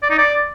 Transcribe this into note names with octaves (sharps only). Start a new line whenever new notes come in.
D5
D#4
D5